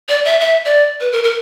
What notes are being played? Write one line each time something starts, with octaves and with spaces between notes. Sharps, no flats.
D5
E5
E5
D5
B4
A#4
A#4